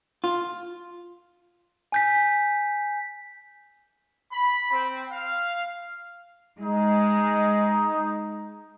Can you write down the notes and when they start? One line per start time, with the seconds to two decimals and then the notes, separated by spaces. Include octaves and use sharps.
0.24 F4
1.92 G#5 G6 B6
4.32 B5
4.71 C4
5.12 F5
6.60 G#3 D#4